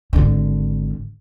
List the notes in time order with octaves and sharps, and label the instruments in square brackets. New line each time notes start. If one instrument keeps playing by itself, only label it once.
[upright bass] G#1 D3